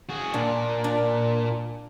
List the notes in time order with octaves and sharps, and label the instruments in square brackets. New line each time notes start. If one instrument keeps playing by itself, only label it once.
[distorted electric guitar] F#4 G#4
[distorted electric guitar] A#2 [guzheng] D4
[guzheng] D4